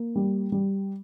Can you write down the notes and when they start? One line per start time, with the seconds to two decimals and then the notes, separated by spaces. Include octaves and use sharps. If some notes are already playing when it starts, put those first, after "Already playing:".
Already playing: A#3
0.16 G3
0.52 G3